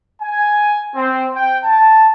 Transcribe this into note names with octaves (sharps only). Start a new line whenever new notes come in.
G#5
C4
G5
A5